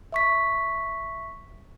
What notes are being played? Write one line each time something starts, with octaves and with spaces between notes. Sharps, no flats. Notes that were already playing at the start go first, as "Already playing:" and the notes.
E5 C#6 B6